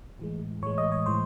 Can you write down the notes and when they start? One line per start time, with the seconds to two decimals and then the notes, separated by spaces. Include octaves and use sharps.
0.19 A2 E3 G#3
0.63 A2 E3 G#3 C#5
0.78 D#5
0.92 C#5
1.06 A2 E3 G#3 C5